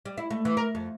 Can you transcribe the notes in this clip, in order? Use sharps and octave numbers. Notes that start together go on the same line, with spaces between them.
G3
E4
A3
E3
A#4
F2